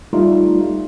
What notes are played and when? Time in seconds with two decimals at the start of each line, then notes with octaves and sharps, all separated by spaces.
0.13 G3 A3 D#4 F4